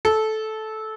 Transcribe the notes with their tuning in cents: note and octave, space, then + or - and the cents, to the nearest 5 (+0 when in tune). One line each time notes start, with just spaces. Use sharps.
A4 -15